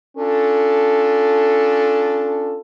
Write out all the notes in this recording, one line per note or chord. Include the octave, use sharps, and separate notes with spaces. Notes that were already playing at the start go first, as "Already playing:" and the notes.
C#4 D4 F4 A4